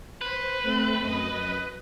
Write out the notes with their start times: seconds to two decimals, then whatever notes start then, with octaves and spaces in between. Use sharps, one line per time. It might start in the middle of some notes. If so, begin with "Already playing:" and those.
0.21 B4 C5
0.63 A3 C4
1.01 F#2 D#5